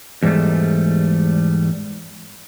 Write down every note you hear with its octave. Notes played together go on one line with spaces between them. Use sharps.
E2 G#2 G3 A3